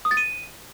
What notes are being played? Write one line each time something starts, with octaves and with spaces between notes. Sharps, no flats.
D#6
A6
D#7